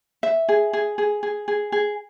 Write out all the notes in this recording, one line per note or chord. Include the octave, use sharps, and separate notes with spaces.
E5
G#4
G#4
G#4
G#4
G#4
G#4